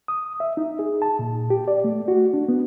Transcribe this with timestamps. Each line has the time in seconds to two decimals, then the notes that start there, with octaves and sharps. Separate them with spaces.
0.08 D#6
0.40 E5
0.57 D#4
0.79 G#4
1.02 A5
1.19 A#2
1.50 G4
1.68 D5
1.84 A3
2.08 F#4
2.34 D4
2.49 B3